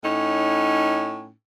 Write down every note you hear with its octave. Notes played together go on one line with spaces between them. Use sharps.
A2 C#4 D#4